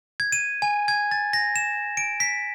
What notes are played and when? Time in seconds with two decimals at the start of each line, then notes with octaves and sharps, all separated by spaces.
0.20 G#6
0.32 D#7
0.62 G#5
0.88 G#6
1.11 A6
1.33 A#6
1.56 E7
1.97 D7
2.20 B6